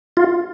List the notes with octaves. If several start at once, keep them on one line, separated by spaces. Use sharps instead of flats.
F4